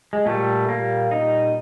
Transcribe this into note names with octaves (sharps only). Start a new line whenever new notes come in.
G#3
A#2 G3 A3
A#3
D#4